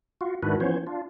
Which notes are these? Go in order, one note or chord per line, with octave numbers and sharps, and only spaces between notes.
F4 F#4
G#2 D#3 D4 E4 F#4 B4
E3 F3 B3 C#4 C5 C#5
D4 F4